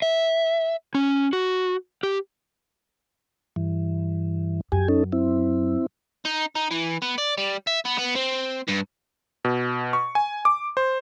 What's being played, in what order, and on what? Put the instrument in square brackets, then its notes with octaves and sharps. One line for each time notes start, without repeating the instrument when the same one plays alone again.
[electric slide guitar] E5
C#4
F#4
G4
[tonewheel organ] G2 E3
[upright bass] F#2 [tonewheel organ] G4 G#5
[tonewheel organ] C#4 D#4 A4
C4 E4
[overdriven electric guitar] D#4
D#4
E3
B3
D5
G3
E5
B3
B3
C4
G2
[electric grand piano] B2
C#6
G#5
D6
C5